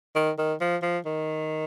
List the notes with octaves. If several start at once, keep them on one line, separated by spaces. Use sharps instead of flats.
D#3
D#3
F3
F3
D#3